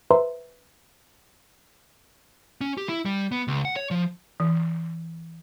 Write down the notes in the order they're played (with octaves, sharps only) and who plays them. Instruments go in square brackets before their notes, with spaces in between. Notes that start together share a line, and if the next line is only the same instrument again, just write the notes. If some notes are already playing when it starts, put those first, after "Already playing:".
[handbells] B4 C5 E5 A#5 C6
[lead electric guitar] C#4
G4
E4
G3
B3
C#2
F#5
C#5
F3
[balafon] E3